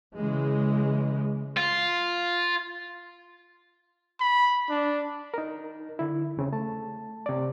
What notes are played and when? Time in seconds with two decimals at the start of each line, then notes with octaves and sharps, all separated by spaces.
0.16 C#3 E3 G#3
1.58 F4
4.20 B5
4.70 D4
5.34 D#4 A#4
5.99 D3 E4
6.37 E2 C#3 C4
6.52 A3 A5
7.26 C3 D5